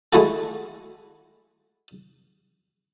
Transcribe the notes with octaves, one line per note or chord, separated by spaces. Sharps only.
G#3 A3 E4 F#4 A4